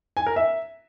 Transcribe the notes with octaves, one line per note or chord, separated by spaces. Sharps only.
G#5
A#4
E5